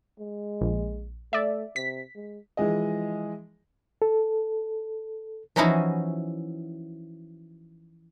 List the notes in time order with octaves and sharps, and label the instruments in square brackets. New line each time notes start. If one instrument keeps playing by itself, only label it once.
[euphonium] G#3
[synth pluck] A#1
[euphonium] A3 [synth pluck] D5 E5
[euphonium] C3 [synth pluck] B6
[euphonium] G#3
[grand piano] E3 F3 G#3 G#4 D#5
[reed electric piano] A4
[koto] E3 F3 C#4 D#4 E4 F#4